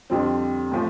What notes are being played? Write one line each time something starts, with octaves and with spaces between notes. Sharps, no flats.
F2 D3 G3 C4
A2 F3